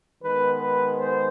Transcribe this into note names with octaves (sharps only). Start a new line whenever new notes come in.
D#3 G#3 B3 B4
B4
C5